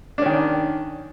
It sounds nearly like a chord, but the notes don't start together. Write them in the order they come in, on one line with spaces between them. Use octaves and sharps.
D4 C#4 D#3